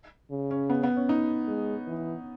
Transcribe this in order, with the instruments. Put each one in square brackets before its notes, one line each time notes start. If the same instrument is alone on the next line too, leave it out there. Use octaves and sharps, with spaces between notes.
[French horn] C#3
[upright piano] C#4
B3
B3
C#4
D#4
[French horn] G#3
E3